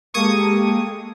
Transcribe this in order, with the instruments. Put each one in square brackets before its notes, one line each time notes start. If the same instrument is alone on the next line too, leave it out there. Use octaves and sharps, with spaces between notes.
[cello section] G#3 [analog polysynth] A#3 G4 A4 [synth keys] C#6 D#6 G#6